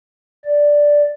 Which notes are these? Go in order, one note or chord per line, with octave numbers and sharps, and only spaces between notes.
D5